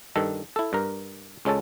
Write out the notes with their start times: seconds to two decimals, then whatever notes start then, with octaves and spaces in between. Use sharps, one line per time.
0.16 G2 D#3 A4
0.56 E4 A4
0.73 G2 A#4
1.45 C#2 G#3 C#4 A4 A5